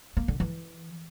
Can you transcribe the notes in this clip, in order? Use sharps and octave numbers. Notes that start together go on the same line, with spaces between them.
A#3
D3
E3